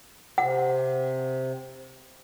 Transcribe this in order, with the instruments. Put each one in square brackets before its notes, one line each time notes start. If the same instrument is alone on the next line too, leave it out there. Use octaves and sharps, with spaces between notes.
[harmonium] C3 [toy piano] F#5